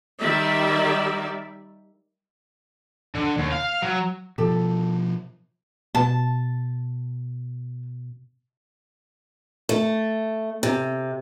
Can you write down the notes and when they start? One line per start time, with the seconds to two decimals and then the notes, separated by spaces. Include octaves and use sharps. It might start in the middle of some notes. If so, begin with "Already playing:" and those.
0.20 D#3 G3 D5 E5
3.15 D3
3.38 D#2
3.52 F5
3.82 F#3
4.38 B2 F3 G4 A4
5.95 B2 A5
9.69 A3
10.63 C3